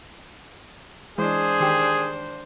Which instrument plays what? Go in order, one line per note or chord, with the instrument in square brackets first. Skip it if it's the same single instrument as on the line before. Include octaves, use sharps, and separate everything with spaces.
[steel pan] E3 G#3 [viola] D4 C5 [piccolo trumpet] G#4
[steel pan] D#3 G4